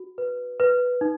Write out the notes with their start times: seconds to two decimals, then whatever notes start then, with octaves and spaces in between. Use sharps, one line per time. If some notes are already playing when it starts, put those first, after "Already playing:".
Already playing: F#4
0.18 B4
0.60 B4
1.01 D#4